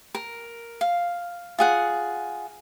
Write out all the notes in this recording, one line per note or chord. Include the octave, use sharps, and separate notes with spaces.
A#4
F5
F4 G#4 F#5